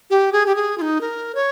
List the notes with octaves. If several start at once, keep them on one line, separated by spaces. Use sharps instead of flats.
G4
G#4
G4
G#4
F4
D#4
A#4
C#5